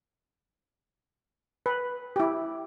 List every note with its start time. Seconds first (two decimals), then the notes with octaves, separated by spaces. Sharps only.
1.66 B4
2.16 E4 G4